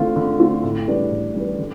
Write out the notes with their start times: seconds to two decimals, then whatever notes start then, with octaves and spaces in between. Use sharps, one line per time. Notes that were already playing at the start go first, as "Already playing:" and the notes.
Already playing: D3 A3 C4 F4
0.16 D3
0.39 A3 C4 F4
0.63 A2
0.88 G3 D4 G4 B4
1.11 A2
1.35 G3 D4 G4 B4
1.59 D3